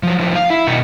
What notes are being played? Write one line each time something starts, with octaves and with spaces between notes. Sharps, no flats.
F3 F#3
A2 D#3 F3
F5
E4
B2 D#3 D#4 F#4